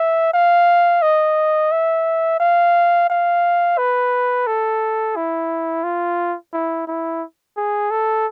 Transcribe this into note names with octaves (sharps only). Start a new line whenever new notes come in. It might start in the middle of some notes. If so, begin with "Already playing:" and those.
Already playing: E5
F5
D#5
E5
F5
F5
B4
A4
E4
F4
E4
E4
G#4
A4